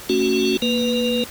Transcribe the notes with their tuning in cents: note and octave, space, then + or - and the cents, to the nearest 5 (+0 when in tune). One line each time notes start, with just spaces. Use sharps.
A3 +35 C#4 +0 F#4 +0
A#3 +0 B4 +0